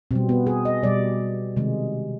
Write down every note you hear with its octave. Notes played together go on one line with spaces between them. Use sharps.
B2 G3 C4
B3
G#4
D#5
B2 G3 D5
C3 D#3 G#3